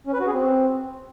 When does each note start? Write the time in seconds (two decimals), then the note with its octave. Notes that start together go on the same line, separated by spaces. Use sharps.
0.07 C#4
0.14 B4
0.20 F#4
0.27 G#4
0.33 C4